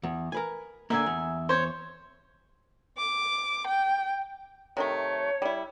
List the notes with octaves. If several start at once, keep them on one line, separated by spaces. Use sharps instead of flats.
E2
A#4 B4 G#5
D3 A#3 E5 G#5
E2
C5 C#5
D6
G5
C3 D#3 A3 C#5
G3 E4